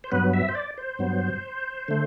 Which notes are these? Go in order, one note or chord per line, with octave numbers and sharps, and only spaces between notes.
C5
G2 F#3 B3 B4
E5
C5
D5
C5
G2 F#3 B3
D3 A3